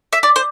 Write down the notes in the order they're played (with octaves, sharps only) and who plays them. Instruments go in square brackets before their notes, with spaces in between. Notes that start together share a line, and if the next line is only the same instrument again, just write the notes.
[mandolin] E5
D5
C5